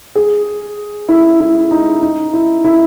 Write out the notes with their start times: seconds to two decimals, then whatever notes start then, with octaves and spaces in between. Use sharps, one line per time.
0.15 G#4
1.09 E4
1.40 E4
1.71 D#4
2.02 D#4
2.33 E4
2.64 E4